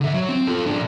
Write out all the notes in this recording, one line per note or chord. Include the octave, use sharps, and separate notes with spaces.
D3 E5
F#3
C4
F4 A4
A#2 D4